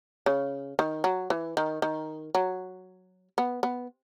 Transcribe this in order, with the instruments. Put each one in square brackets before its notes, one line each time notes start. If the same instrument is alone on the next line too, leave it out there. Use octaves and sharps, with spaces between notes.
[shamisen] C#3
D#3
F#3
E3
D#3
D#3
F#3
B3
B3